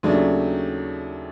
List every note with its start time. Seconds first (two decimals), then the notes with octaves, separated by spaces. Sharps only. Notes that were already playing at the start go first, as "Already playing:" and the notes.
0.03 D#2 C#3 F#3 A3 D4